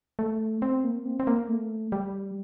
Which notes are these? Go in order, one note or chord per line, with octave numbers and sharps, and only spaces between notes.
A3
C4
A#3
C4
C4
A#3
A3
G3